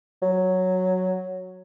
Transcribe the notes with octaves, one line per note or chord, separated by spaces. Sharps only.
F#3